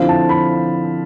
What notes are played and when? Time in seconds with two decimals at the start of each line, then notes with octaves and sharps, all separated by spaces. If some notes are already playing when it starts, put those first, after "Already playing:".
Already playing: D3 F3 C4 E4 F5
0.09 A5
0.29 B5